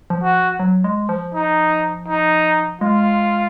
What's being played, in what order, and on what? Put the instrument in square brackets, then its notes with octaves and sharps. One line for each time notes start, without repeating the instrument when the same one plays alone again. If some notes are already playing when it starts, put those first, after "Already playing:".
[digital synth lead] F3
[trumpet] F#4
[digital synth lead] F#3
G#3
F3
[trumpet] D#4
D#4
[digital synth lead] G#3 [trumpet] F4